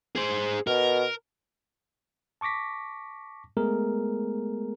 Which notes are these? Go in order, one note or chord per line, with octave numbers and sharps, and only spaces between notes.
G#4 C5
B2 A#4
A5 C#6 D6 A#6 B6
G#3 A3 B3 G#4 A#4